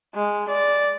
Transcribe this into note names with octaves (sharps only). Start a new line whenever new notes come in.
G#3
D5